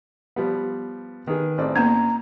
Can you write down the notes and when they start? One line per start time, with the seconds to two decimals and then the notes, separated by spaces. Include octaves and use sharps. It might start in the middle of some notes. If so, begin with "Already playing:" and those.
0.36 F3 G3 B3
1.27 D#3 G#4 B4
1.58 A1 C4 D5
1.76 A#3 B3 C#4 A#5